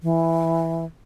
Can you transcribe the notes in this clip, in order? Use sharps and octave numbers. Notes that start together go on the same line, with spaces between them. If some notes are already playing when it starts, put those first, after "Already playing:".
E3